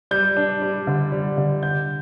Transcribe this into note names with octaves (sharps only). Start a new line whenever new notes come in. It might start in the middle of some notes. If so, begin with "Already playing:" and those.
G3 G6
D4
G3
D3
G3
D3
D3 G6